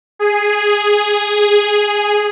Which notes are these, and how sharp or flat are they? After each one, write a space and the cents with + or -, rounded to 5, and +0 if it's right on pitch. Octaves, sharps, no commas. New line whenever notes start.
G#4 -5